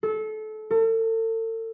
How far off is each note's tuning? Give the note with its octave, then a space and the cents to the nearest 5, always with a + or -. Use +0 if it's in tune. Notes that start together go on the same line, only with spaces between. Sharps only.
A4 -25
A4 +40